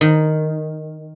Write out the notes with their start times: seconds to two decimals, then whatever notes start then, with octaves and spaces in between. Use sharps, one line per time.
0.01 D#3